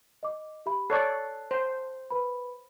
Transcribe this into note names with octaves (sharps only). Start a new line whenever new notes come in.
D#5 D6
G4 E5 B5
A4 C#5 D5 A5 F#6 C7
C5
B4 B5